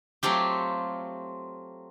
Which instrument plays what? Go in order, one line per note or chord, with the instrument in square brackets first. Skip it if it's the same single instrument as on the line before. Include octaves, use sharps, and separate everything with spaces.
[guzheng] F#3 A3 C4 F4 G4